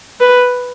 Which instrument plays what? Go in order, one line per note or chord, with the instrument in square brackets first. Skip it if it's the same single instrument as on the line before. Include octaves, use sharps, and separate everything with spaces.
[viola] B4